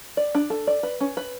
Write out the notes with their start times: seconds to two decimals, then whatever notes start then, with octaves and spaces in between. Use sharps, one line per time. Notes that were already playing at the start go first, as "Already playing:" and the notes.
0.17 D5
0.35 D4
0.50 A4
0.67 D5
0.83 B4
1.00 C#4
1.17 B4